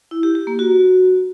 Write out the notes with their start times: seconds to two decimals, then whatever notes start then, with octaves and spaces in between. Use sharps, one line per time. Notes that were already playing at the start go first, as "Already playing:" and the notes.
0.11 E4
0.23 G4
0.35 G4
0.47 A#3
0.59 F#4